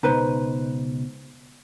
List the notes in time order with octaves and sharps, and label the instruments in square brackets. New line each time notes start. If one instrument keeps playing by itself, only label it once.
[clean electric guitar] C#2 B2 [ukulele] D#4 B4 C5